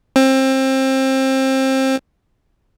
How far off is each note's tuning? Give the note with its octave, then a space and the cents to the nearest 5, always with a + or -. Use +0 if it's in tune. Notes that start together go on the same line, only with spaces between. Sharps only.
C4 +25